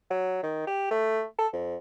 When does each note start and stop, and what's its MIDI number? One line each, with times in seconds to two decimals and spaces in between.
0.10 0.40 54
0.43 0.67 51
0.67 0.88 67
0.91 1.24 57
1.38 1.47 69
1.53 1.76 41